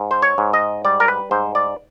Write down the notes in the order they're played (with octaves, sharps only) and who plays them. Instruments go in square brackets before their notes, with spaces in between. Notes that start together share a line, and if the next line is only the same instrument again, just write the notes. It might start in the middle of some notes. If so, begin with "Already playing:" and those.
Already playing: [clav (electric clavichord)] G#2
C5
C#5
G#2
D#5
G3 D5
A#4
B4
G#2 C5
D5